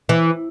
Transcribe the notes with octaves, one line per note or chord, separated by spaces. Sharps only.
E3